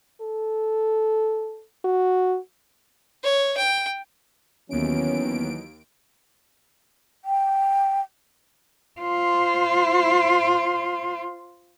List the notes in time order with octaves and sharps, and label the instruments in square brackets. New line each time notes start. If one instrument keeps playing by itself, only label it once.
[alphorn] A4
F#4
[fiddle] C#5
G5
[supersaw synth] D#2 D7 [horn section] E3 F#3 [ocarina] B3 [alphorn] C#4
[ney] G5
[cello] F4 C5